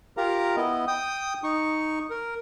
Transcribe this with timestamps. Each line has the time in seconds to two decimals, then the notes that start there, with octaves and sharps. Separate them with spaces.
0.17 F4 G4 A#4 F5 A#5
0.56 B3 E4 D#5
0.87 G5 D#6
1.43 D#4 C#6
2.10 A#4